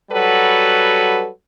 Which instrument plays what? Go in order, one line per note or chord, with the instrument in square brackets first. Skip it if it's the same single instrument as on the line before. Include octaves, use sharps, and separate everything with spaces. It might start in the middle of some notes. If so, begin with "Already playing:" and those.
[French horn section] F#3 G3 F#4 A4 B4